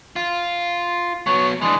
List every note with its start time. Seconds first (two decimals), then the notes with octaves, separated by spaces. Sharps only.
0.16 F4
1.26 F#3 B3 C#5
1.62 E3 G#3 D4